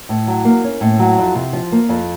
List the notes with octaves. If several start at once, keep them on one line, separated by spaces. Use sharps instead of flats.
A2
F#3
A#3
C#4
A2
F#3
F2
C3
F3
A#3
F2